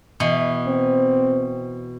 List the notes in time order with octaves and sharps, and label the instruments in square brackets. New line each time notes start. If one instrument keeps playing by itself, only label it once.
[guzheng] B2 E3
[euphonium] C4